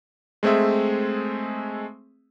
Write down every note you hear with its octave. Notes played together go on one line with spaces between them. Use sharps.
G#3 A3 C4 G#4 E5